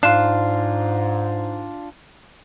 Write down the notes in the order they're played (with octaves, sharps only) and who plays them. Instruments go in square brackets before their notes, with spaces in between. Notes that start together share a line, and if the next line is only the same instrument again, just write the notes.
[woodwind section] G#2 [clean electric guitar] D4 F4 [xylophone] F5 F#6 E7